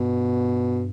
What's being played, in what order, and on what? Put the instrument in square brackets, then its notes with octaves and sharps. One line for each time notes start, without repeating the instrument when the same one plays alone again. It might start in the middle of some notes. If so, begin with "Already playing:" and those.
Already playing: [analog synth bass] G2 [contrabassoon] B2